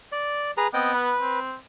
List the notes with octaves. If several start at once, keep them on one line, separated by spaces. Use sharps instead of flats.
D5
G#4 B4 A#5
B3 C4 D#5 G5
B4
C4